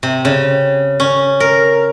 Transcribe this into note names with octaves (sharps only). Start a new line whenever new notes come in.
C3
C#3
C#4
A#4